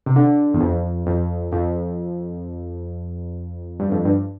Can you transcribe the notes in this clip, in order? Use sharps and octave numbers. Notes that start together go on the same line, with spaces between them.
C3
D3
E2
F2
F2
F2
G2
F2
G2